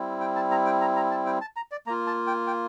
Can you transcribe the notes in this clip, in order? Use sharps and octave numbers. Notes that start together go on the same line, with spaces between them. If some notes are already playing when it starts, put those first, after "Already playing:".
Already playing: G3 C4 E4
G5
A5
A#5
G5
A#5
A#5
A5
G5
A5
A#5
D5
A#3 F4 A#5
A5
G5
G5